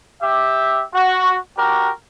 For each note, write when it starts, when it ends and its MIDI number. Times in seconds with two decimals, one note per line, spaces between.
0.22 0.83 67
0.22 0.83 76
0.95 1.36 66
1.58 1.90 62
1.58 1.90 66
1.58 1.90 67
1.58 1.90 70